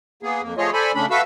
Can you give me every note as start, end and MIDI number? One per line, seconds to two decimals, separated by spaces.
0.23 0.42 58
0.23 0.42 59
0.23 0.42 68
0.42 0.54 41
0.42 0.54 58
0.57 0.70 53
0.57 0.70 57
0.57 0.70 65
0.57 0.70 68
0.57 0.70 73
0.57 0.70 75
0.73 0.92 69
0.73 0.92 72
0.73 0.92 74
0.73 0.92 80
0.73 0.92 83
0.95 1.06 49
0.95 1.06 57
0.95 1.06 61
0.95 1.06 62
0.95 1.06 83
1.11 1.21 66
1.11 1.21 69
1.11 1.21 71
1.11 1.21 76
1.11 1.21 77
1.11 1.21 88